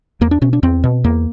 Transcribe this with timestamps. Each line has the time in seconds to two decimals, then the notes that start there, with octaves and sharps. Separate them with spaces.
0.21 E2 A#3
0.31 D4
0.42 B2 C#4
0.53 D4
0.63 E2 C4
0.84 B2
1.04 E2 A#3